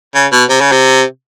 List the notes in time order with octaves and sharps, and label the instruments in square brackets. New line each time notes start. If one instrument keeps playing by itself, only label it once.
[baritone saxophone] C#3
B2
C3
C#3
C3